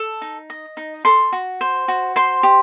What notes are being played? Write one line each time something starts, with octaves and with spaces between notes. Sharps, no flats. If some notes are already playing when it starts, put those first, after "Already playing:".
Already playing: A4
D#4
D#5
D#4
A4 C6
F#4
C5
F#4
C5 C6
G4